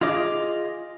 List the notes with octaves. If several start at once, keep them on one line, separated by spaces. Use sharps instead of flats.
F4 G#4 D#5 D6